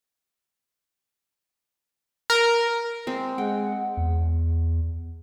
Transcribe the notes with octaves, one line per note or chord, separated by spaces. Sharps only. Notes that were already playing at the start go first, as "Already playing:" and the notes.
A#4
G#3 C4
G#3 F#5 G5
E2